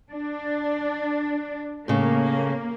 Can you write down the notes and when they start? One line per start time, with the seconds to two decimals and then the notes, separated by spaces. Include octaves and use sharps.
0.12 D4
1.88 A2 C#3 A#3